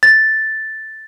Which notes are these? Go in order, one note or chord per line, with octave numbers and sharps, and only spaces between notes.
A6